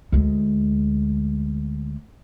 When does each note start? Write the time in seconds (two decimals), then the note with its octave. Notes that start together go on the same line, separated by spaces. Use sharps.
0.12 D2 G#3